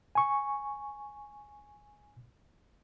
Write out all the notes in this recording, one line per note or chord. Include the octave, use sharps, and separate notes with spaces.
G#5 C#6